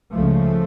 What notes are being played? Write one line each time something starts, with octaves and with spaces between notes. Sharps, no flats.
C#2 C#3 F3 A3